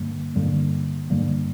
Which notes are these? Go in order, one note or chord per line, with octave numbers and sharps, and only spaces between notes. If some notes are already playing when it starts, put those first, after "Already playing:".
Already playing: G2 D3 G3 A#3
G2 D3 G3 A#3
G2 D3 G3 A#3